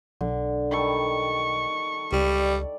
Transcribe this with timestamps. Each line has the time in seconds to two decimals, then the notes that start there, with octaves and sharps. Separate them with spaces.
0.21 B1 D3
0.71 D#3 G3 A4 C#6
2.12 C#2 G3 D5